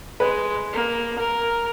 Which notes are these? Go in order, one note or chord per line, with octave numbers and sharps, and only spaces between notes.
G#3 B4
A#3
A#4